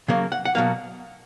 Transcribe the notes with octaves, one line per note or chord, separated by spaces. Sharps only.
C#3 F#3 A#3
F#5
F#5
B2 F#3 A#3 F5